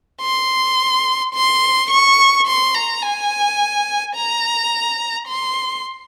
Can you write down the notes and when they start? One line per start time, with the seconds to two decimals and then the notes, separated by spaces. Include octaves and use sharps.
0.21 C6
1.34 C6
1.90 C#6
2.47 C6
2.74 A#5
3.02 G#5
4.15 A#5
5.28 C6